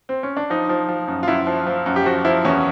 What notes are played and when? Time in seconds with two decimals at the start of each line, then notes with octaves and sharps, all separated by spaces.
0.09 C4
0.23 C#4
0.37 D4
0.50 F3 D#4
0.69 F3
0.89 F3
1.08 F#2
1.23 F4
1.28 F#2 E4
1.47 F3
1.67 F3
1.86 F#2
1.96 G4
2.05 F3 F#4
2.25 F3 E4
2.45 E2 C#4